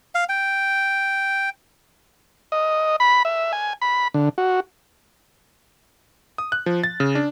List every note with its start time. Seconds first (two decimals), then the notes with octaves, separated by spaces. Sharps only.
0.15 F5
0.29 G5
2.52 D#5
3.00 B5
3.25 E5
3.53 G#5
3.82 B5
4.14 D3
4.38 F#4
6.38 D#6
6.52 F#6
6.66 F3
6.84 A6
7.00 C#3
7.15 D4